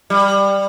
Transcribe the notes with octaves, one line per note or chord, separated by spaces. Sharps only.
G3